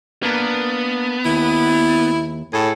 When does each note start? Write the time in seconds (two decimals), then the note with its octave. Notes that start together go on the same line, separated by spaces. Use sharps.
0.23 A#3 B3 D4 A#4
1.25 D#2 E4
2.53 A2 G#4 A4